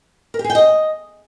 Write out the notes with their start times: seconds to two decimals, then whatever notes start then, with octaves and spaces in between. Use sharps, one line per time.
0.34 A#4
0.39 G4
0.44 G#4
0.50 G5
0.55 D#5